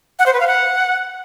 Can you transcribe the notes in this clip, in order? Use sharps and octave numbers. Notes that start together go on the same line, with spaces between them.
F#5
C5
B4
F5
F#5